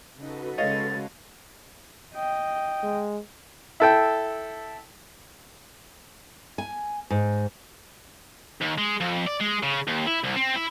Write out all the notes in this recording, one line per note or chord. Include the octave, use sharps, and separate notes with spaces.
C#3 D#4 F#4 A4 B4
C#3 G#3 C#5 D#5 F5 A6
D#5 G5
G#3
E4 A4 G5
G#5
G#2
D#2
G#3
F2
D5
G#3
C#3
D#2
E4
C2
C4
E4